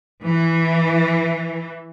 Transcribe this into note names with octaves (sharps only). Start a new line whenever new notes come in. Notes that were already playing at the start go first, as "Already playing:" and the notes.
E3